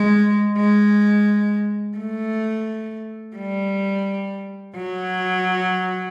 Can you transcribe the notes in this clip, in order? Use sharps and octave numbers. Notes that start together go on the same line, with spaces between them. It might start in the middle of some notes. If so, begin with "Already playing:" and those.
Already playing: G#3
G#3
A3
G3
F#3